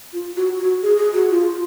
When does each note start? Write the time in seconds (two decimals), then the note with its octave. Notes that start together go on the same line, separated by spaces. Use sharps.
0.13 F4
0.37 F#4
0.59 F#4
0.83 G#4
0.98 G#4
1.13 F#4
1.30 F4